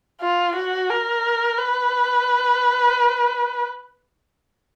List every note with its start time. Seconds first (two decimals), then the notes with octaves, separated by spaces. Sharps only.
0.21 F4
0.55 F#4
0.90 A#4
1.58 B4